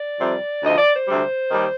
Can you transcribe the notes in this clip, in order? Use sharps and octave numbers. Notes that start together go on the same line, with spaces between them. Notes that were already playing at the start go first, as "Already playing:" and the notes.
Already playing: D5
F2 C3 G3
D2 C3 F3 D#5
D5
C5
D2 C3 G3
D#2 D#3 G3